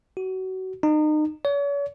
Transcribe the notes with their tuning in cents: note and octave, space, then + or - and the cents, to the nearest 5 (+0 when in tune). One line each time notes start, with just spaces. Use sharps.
F#4 +25
D#4 -30
C#5 +40